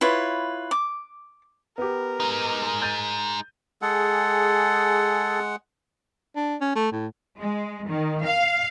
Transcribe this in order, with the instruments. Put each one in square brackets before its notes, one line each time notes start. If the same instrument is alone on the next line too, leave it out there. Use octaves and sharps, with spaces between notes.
[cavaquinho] E4 F4 B4 C#5
D6
[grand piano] B3 G4 [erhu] A#4
[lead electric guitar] G#3 D#4
[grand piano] G6 A6 D#7
[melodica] G#3 F#5 [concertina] G#4 A4
[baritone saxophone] D4
C#4
A3
A2
[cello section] G#3
D#3
F5